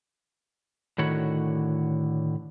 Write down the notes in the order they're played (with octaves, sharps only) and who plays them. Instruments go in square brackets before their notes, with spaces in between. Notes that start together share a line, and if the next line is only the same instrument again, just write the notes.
[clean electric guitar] A2 D3 D#3 F#4 C#5 B5